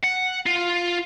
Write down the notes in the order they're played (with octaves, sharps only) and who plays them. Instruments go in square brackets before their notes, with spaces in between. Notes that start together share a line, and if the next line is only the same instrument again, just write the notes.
[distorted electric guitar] F#5
F4